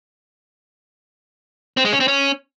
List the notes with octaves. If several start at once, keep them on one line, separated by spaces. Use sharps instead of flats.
C4
G#3
C#4
C4
C#4